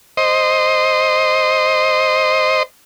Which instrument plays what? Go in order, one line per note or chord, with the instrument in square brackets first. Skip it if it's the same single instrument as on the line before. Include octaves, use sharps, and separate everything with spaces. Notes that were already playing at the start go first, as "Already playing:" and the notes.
[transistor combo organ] C5 D#5